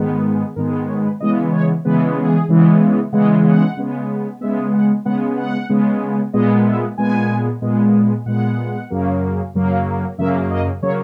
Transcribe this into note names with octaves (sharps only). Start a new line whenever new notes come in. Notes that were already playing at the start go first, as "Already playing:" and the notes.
Already playing: G#2 D#3 G#3 B3
B4
G#4
G#2 D#3 G#3 B3 A#4
B4
C#5
B4
C#3 E3 G#3 B3 D#5
C#5
C#3 E3 G#3 B3 B4
G#4
C#3 E3 G#3 B3
C#3 E3 G#3 B3 F#5
F#5
C#3 G#3 B3
C#3 G#3 B3 E5
F#5
C#3 G#3 B3 F#5
F#5
C#3 G#3 B3
A#2 G#3 B3 D#5
E5
A#2 G#3 B3 G#5
A#2 G#3 B3
A#2 G#3 B3 F#5
F#2 C#3 F#3 A#3
F#2 C#3 F#3 A#3
F#2 C#3 F#3 A#3 E5
D#5
C#3 F#3 A#3 C#5